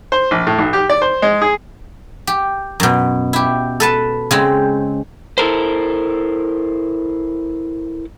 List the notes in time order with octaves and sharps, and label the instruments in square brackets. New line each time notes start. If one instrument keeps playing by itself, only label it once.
[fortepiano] C5
A#1
A2
B1
G4
D5
C5
G#3
G#4
[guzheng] G4
F#2 B2
E4 G4
A4 B4 A5
C#3 G#3 C4
[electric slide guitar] E4 A4 A#4 C5